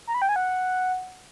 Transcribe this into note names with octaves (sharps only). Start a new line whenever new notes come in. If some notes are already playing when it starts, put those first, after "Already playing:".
A#5
B5
G5
G#5
F#5